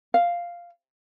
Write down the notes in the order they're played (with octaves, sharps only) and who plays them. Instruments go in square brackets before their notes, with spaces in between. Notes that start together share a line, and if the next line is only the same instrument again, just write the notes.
[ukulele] F5